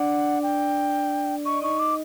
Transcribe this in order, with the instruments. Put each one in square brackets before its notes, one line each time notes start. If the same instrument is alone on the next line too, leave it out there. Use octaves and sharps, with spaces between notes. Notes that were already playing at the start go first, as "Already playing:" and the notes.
Already playing: [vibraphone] D4 D5 [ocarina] F#5
[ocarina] G5
[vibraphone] D#5 [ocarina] C#6
[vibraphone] D5
[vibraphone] D#4 D#5 [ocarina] C#6
[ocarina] D6